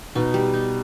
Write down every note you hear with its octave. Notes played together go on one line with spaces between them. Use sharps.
B2 D#4
G3
D#4